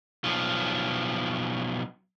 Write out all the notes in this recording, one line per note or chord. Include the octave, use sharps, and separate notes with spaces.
B1 F3